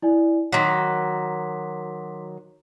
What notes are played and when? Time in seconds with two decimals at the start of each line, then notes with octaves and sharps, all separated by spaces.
0.02 E4 D5 G#5
0.52 D#3 F#3 C6 D6 B6